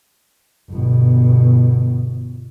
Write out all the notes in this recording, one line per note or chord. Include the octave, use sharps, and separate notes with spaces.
G1 B2